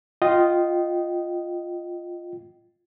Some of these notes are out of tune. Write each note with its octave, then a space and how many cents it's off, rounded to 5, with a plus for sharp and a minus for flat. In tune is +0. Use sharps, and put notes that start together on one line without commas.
F4 +0 D#5 +0 G5 -25